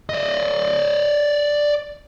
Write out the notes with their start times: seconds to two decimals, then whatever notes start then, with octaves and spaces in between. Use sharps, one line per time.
0.09 D5 D#5